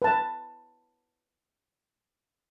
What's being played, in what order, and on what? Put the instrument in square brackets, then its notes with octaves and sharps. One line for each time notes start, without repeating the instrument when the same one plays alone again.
[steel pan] B4 A5